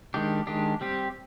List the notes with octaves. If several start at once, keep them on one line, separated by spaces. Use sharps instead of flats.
D#3 G#3 D4 G4
D#3 G#3 D4 G4
G3 C4 G4